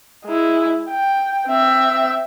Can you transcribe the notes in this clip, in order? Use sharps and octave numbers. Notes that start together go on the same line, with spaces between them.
G#3 E4
G5
C4 E5